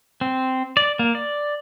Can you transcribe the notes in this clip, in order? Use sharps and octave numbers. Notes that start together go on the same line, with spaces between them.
C4
D5
A#3
D5